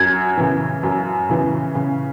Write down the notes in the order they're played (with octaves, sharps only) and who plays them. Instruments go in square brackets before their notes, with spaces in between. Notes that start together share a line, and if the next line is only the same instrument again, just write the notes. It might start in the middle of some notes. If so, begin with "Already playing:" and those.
Already playing: [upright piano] F#2 [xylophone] G#6
[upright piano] C#3 E3
F#2
C#3 E3
C#3